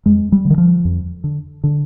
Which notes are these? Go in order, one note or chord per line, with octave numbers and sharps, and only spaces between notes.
F2 G#3
G3
D3
D#3
F3
F2
D3
D3